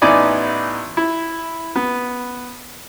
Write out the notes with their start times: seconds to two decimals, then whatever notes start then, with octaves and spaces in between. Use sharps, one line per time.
0.02 A1 B3 D#4 E4 D5 G#5
0.97 E4
1.76 B3